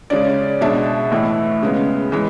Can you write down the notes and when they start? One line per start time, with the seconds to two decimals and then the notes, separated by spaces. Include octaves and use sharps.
0.10 C#3 G#3 C#4 D5
0.61 B2 G#3 D4 E5
1.11 A2 E3 B3 E4
1.63 C#3 G#3 B3
2.12 E3 G#3